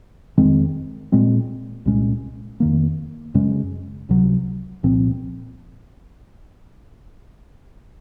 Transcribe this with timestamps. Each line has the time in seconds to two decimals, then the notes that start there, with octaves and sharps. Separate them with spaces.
0.38 F2 D#3 G#3 C4
1.12 A#2 G#3 C4
1.85 C2 A#2 G#3 C#4
2.60 F2 D#3 A#3
3.34 F#2 C#3 G#3 C#4
4.09 C#2 C3 F#3
4.83 C2 A#2 F3 C4